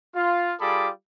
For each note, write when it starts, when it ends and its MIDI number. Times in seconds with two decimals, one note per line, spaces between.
0.15 0.54 65
0.61 0.89 55
0.61 0.89 65
0.61 0.89 68
0.61 0.89 69
0.61 0.89 83
0.61 0.89 86